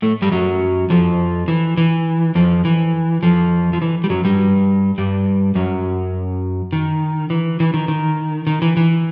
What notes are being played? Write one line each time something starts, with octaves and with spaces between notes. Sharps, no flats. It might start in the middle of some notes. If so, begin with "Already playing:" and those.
A2 A3
G2 G3
F#2 F#3
F2 F3
E3
E3
F2 F3
E3
F2 F3
F3
E3
G3
F#2 F#3
G2 G3
G2 G3
F#2 F#3
D#3
E3
E3
D#3
D#3
D#3
E3
E3